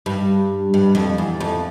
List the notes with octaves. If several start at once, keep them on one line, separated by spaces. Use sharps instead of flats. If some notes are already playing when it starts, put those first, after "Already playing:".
G2
G2
F2
E2
F2